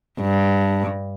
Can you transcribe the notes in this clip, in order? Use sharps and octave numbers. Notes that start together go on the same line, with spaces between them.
G2